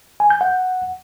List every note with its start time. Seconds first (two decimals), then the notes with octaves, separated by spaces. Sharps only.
0.20 G#5
0.30 G6
0.41 F#5